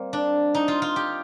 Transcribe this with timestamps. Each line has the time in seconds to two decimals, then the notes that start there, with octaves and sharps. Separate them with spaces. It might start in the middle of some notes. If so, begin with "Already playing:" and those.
Already playing: G3 A#3 C4
0.13 D4
0.55 D#4
0.68 F4
0.82 F4
0.96 G4